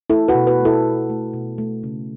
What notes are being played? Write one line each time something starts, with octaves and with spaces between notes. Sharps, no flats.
A3 E4 A4
F#4 B4
B2
F#4 B4
A3
E4 A4
B2
A3
B2
A3
C#3